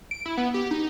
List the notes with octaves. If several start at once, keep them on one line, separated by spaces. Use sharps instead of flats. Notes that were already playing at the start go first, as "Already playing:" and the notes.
D7
E4
B3
G4
D#4